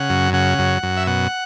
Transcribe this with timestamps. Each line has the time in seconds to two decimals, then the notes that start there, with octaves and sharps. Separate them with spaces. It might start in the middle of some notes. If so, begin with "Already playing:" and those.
Already playing: C#3 F#5
0.10 F#2
0.33 C#3 F#5
0.59 F#2
0.83 F#2
0.97 E5
1.07 B2 F#5